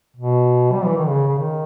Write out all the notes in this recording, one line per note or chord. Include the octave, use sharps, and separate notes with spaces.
B2
G3
E3
D#3
C#3
C#3
D#3